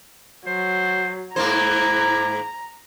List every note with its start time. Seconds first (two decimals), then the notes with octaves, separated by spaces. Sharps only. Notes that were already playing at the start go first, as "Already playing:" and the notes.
0.47 F#3 C5
1.36 G#2 A#3 E4 C5 A#5